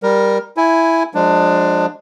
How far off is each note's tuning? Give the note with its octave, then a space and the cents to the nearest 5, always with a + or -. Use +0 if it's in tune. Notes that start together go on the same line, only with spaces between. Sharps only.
G3 +10 A#4 +10
E4 +0 G#5 +0
F3 +30 G#3 +0 D4 +20